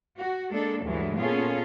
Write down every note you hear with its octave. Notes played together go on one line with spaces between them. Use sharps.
F#4
G#3 A#3 D4 A4
D2 G2 E3 F#3 G#3
A#2 B3 C#4 F4 G#4 A4